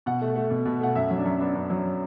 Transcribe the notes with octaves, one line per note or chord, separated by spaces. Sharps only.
B2 F#5
A3
A3
B2
B2
A3 F#5
F#2 E5
F#3
D4
F#2
B3 D4
F#2
F#3